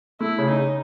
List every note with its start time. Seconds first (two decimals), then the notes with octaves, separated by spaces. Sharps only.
0.20 A3 E4
0.38 C#3
0.49 D#4
0.58 C#3